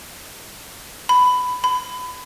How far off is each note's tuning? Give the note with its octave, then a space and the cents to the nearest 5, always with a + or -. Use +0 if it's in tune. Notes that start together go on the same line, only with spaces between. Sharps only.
B5 +15
B5 +30